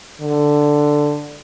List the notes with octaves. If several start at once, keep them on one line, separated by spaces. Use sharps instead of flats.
D3